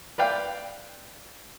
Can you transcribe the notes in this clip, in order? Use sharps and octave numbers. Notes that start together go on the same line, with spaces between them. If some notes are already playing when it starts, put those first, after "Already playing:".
B4 D5 F5 G5